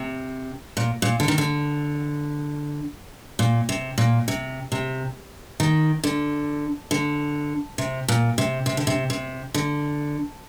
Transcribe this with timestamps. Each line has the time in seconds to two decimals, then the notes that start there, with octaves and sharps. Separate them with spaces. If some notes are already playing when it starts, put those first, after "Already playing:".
Already playing: C3
0.77 A#2
1.02 A#2
1.20 D3
1.28 D#3
1.38 D3
3.39 A#2
3.69 C3
3.98 A#2
4.28 C3
4.72 C3
5.60 D#3
6.04 D3
6.91 D3
7.78 C3
8.08 A#2
8.38 C3
8.66 C3
8.77 D3
8.87 C3
9.10 C3
9.54 D3